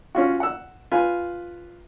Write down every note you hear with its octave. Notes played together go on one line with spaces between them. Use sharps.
C#4 F4 F#4
F#5 E6
F4 B4 G#5